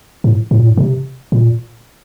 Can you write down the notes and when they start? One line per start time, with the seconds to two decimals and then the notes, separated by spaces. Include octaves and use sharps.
0.24 A2
0.51 A2
0.59 A#2
0.67 A2
0.77 C3
1.32 A#2